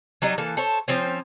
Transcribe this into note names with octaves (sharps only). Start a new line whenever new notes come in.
F#3 G3 D#4 D#5
E3 A#3 A4
A4 C5 C#5
F3 C4 C#4